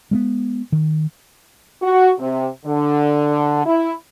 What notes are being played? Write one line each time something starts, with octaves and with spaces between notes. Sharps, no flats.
G#3 A3 B3
D#3
F#4
C3
D3
E4